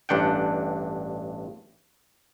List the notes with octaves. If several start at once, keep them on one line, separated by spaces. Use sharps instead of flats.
A1 G2 D4 F#5 G5